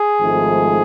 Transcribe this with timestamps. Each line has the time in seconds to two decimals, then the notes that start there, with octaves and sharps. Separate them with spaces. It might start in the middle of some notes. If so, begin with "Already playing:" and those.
Already playing: G#4
0.19 G#1 G#2 F3 A3